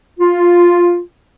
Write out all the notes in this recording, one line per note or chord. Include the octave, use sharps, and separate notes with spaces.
F4